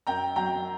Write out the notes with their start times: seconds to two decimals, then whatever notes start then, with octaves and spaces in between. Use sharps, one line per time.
0.07 F#2 G5 A#5
0.36 F#3 G5 A#5